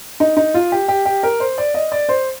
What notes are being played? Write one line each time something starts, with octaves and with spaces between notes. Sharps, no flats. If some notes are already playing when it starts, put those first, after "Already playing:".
D#4
D#4
F4
G4
G4
G4
A#4
C5
D5
D#5
D5
C5